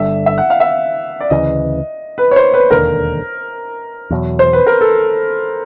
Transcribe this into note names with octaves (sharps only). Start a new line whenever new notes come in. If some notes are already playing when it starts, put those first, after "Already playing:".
Already playing: G1 G2 D3 E5
E5
F#5
F5
E5
D5
D2 C#3 E3 D#5
B4
C#5
C5
B4
E1 D#2 D3 A#4
E2 B2 F#3
C5
B4
A#4
A4